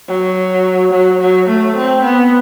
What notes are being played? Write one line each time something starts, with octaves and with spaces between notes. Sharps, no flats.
F#3
F#3
F#3
A3
C4
B3